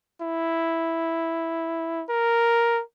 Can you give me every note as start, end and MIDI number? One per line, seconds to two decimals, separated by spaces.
0.21 2.04 64
2.09 2.82 70